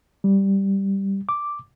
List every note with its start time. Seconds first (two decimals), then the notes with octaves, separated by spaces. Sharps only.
0.24 G3
1.29 D6